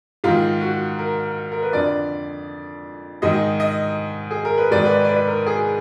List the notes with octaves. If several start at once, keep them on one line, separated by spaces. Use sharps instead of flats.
G#2 D#3 F4
F#4
A#4
A#4
B4
F2 D3 D5
G#2 D#3 D#5
D#5
G#4
A#4
B4
G#2 D#3 D5
B4
D5
D5
B4
A#4
G#4